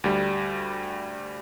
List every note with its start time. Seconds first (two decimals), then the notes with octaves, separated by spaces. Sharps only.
0.04 D2 G3